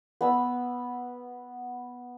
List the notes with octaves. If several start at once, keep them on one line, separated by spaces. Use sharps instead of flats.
B3 B5 E6